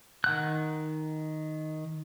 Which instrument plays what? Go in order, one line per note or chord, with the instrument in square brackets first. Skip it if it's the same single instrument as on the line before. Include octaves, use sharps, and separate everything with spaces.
[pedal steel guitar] D#3 F#5 F#6